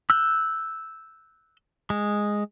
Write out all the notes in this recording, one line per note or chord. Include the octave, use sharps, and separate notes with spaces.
E6 F#6 G6
G#3